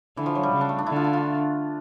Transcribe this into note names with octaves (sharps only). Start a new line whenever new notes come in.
D3 E3
F3
F#3
G3
C#3
D4
A3
D4
D3 E4
F4
E4
F4